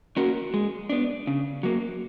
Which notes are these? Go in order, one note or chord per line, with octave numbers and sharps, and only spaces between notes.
A#3 C#4 F#4 A#4
G#3
B3 D4
C#3
F#3 A#3